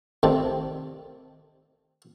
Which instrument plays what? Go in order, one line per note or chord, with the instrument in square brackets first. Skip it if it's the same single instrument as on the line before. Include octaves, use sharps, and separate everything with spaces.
[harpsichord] C3 D#3 G3 A3 C4 D4